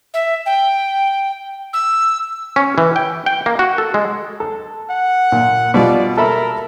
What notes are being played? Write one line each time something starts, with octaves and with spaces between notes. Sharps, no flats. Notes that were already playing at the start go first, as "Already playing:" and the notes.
E5
G5
E6
C#4
E3
G5
G5
A#3
F#4
A4
G#3
A4
F#5
A#2
B2 G3 F4 D5
A4 A#4 E5 B5